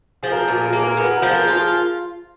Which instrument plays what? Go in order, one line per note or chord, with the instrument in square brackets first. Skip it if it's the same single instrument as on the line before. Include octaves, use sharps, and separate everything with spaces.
[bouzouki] F3 [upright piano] G#4
[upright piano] A#4
G#4
[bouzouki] A#2 [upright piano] A#4
[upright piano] G#4
A#4
[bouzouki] A#3 [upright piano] G#4
[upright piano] A#4
G#4
[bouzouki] B3 [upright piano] A#4
[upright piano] G#4
A#4
[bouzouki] F3 [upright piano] G#4
[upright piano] A#4
G#4
[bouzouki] F4 [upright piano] A#4
[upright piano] G#4